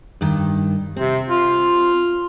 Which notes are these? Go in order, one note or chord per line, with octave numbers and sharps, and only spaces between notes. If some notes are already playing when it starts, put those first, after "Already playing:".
G2 D#3
C3 C4
F4